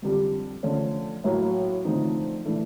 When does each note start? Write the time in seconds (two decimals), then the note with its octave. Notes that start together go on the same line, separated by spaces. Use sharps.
0.02 F2 D3 G3
0.63 D3 F3 A3 C#4
1.24 A2 F#3 A#3
1.85 D3 F3 A3 C4 D#4
2.46 E3 A3 D4